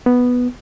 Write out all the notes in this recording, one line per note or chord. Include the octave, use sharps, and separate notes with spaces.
B3